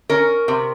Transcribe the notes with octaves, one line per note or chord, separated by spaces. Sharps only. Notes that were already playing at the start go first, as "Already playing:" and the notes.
C#4 A#4
C3